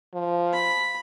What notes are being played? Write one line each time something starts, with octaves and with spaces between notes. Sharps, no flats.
F3
B5